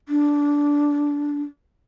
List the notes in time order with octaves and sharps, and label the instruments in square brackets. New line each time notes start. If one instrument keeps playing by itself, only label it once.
[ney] D4